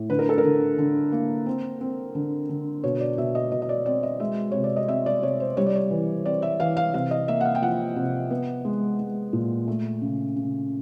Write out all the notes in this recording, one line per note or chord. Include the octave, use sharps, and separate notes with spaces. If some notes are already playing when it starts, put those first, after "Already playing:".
Already playing: A2
D3 B4
A#4
A4
A#4
D3
D3
A#3
C4
C4
D3
D3
B2 C#5
D5
B2 E5
D#5
B2 D#5
D#5
D5
C4 D5
D#5
G#3 E5
C3 C#5
D5
D#5
C4 E5
D5
C3 C#5
C5
G3 C#5
D5
C#5
E3
C4 D5
E5
E3 F5
F5
C3 F5
D#5
A#3 E5
F#5
F5
G5
F3 F#5
C3
B3
G#3
G#3
A#2
A3
C#3
C#3